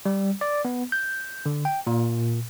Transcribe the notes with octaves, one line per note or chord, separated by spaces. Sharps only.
G3
D5
B3
G6
D3
G5
A#2